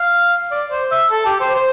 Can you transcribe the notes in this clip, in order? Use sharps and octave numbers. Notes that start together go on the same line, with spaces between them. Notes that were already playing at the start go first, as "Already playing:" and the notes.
Already playing: F5
D5
C5
E5
A4
G4
C5
C5